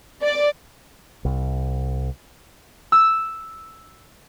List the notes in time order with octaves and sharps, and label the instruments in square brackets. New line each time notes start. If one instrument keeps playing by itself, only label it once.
[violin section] D5
[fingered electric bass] C2
[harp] E6